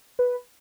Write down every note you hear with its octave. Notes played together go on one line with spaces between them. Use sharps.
B4